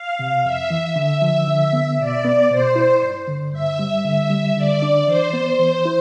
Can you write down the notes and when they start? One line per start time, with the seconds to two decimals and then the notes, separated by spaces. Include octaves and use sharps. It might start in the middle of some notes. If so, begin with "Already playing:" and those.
Already playing: F5
0.19 C3
0.44 F2 E5
0.70 E3
0.96 D3 E5
1.22 F3
1.47 D3
1.73 B3
2.00 B2 D5
2.25 B3
2.50 B2 C5
2.76 E4
3.02 G2
3.28 D3
3.53 G2 E5
3.79 G3
4.04 D3 E5
4.30 G3
4.57 D3 D5
4.82 D4
5.07 E3 C5
5.33 B3
5.59 E3
5.85 E4